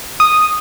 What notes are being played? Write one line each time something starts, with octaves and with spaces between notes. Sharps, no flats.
D#6